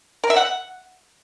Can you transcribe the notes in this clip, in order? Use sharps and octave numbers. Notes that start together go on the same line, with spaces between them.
A#4
E5
F#5